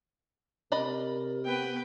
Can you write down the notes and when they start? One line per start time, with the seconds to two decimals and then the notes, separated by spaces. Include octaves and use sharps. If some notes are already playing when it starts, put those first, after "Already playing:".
0.72 C3 A#4 D5 D#5 B5
1.45 B3 B4 G5